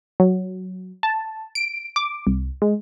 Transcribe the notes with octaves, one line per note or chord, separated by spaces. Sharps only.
F#3
A5
D7
D6
C2
G#3